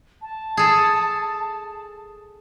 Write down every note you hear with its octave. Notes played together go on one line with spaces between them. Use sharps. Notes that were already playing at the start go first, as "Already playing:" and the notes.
A5
G#4 A4